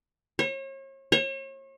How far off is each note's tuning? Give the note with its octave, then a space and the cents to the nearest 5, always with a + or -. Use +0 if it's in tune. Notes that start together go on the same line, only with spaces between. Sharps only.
C#5 -40
C#5 -40